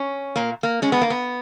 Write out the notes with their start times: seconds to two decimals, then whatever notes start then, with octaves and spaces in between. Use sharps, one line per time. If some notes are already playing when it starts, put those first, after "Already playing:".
Already playing: C#4
0.36 A#2 A#3
0.63 A#3
0.82 G#3 C#4
0.92 B3
1.01 A#3
1.10 B3